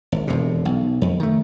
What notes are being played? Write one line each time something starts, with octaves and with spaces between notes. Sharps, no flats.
G#1
E1 F2 C3
B1
F2
D#3 A3